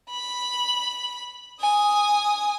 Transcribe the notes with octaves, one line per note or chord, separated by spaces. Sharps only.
B5
G#5 D#6